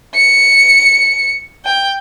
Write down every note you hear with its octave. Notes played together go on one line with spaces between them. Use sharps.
C#7
G5